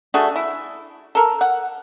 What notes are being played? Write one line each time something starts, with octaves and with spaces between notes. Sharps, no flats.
A3 D4 F#4 G#4
E4
A4 A#4
F#5